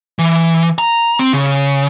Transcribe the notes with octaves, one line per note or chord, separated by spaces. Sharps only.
E3
A#5
C4
C#3